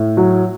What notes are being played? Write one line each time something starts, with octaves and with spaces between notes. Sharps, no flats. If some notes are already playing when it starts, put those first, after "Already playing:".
Already playing: A2
F#3